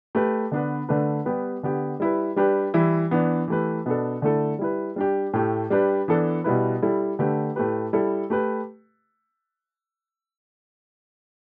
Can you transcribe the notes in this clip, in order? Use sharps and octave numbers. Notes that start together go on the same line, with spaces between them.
A3 G4 B4
D3 B3 D4 B4
D3 A3 D4 B4
G3 B3 G4 B4
D3 B3 G4
G3 E4 B4
G3 D4 G4 B4
E3 G3 E4
E3 B3 D4
E3 A3 G4 B4
B2 B3 D4 A4
D3 A3 E4 A4
G3 E4 B4
G3 D4 G4
A2 A3 G4
G3 D4 G4 B4
E3 B3 D4 A4
B2 G3 E4 B4
G3 E4 A4
D3 A3 G4 B4
A2 A3 G4 B4
G3 E4 A4
A3 G4 B4